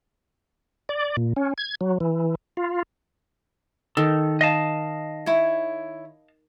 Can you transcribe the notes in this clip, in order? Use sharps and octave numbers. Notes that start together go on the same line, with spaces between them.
D5
A#2
C#4
G#6
F#3
E3
F4
D#3 A4
D#5 F5 A5
E4 C#5